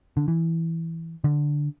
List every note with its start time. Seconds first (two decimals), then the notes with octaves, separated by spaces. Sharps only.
0.17 D3
0.28 E3
1.24 D3